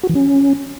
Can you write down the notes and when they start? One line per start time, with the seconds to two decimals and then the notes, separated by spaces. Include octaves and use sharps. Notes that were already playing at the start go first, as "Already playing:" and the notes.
0.03 F#4
0.09 E3
0.15 C#4